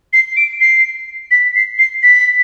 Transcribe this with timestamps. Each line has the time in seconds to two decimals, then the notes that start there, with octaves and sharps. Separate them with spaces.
0.13 C7
0.37 D7
0.61 C7
1.31 B6
1.55 C7
1.79 C7
2.03 B6